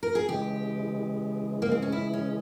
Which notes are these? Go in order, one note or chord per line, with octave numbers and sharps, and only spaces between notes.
A#4
G#4
C#3 E3 G#3 G4
A#3
C4
C#4
E4
C#4